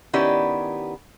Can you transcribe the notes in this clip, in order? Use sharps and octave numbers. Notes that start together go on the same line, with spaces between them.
D#3 B3 C#4 E4 G4 D5